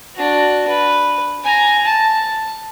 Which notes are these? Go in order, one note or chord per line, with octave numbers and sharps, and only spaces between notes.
D4 F#4
B4
G#5 A#5
A5